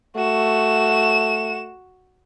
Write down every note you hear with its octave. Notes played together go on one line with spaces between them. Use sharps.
A3 F#4 E7